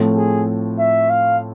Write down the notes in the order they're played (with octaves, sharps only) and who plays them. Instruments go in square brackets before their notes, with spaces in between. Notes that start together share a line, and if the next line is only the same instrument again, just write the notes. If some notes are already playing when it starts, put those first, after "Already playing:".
Already playing: [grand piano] A2 F3 A3 C4 F4
[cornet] G#4
E5
F5